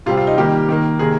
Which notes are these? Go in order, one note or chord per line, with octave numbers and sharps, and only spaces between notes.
C3 G3 C4 F4
F4
D#4
D#3 G3 A#3 G4
D#3 A#3
C3 D#3 A#3 G#4